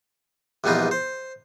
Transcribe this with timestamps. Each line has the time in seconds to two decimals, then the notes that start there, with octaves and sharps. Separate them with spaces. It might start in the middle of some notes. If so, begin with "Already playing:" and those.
0.64 A#1 E2 G3 B3 D#4 F4
0.91 C5